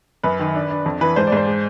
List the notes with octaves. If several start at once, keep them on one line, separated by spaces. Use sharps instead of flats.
F#2 B4
D#3
D4
D4
F2
E3 B4
G#2 C5
D5
G#2 C5
G#3